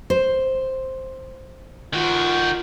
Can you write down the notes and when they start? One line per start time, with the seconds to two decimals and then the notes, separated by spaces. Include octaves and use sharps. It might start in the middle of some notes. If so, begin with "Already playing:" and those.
0.10 C5
1.93 D#3 F4 F#4